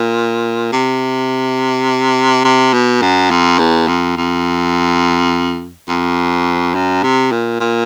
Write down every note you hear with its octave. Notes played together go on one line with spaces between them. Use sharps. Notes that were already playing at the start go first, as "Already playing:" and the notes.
Already playing: A#2
C3
C3
B2
F#2
F2
E2
F2
F2
F2
F#2
C3
A#2
A#2